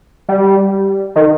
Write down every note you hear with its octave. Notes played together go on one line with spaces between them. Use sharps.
G3
D#3